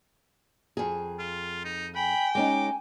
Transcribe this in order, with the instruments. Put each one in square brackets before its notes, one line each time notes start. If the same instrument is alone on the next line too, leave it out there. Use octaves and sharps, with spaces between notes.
[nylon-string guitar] F2 G#4
[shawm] F4
D#4
[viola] G5 [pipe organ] G#5 [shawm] B5
[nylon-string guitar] G#3 C#4 D#4 [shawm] D6